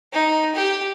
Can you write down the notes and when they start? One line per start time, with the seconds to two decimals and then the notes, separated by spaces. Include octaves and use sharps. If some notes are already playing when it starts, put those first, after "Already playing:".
0.12 D#4
0.55 G4